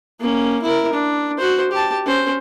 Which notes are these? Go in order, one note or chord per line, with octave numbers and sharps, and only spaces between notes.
A#3 C#4
E4 A#4
D4
F#4 C5
G4 A5
C#4 C5